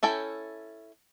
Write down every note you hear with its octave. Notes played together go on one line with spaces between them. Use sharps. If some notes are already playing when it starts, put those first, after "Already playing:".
C#4 E4 A4 G5